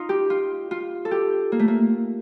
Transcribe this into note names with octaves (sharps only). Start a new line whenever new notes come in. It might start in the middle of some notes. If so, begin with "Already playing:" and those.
Already playing: D#4 F4
G4
F4
F4
A4
G4
A#3
A3
A#3